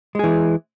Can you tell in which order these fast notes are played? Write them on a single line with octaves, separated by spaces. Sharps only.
G#3 G#4 E3